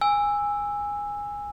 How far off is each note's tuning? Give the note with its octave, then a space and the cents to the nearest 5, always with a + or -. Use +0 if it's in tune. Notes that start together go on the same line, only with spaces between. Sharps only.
G#5 -15 E6 +0